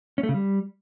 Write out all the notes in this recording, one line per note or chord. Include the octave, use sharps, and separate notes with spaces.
C#4
A3
C#3
G3